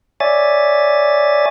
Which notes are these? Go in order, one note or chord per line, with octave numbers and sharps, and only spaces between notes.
C#5 D5 E5 G#5 A6